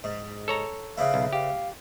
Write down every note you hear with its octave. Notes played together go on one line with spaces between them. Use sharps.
G#2
A4 C#5 A#5
C#3 E3 E4 F5
B1
G4 F5